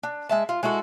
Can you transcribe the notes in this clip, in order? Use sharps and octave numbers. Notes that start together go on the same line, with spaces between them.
D4
G#3 E5 A5
F4
G#3 E4 F#4 A4